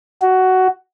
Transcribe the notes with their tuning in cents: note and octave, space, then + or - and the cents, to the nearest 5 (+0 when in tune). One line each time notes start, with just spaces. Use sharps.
F#4 +10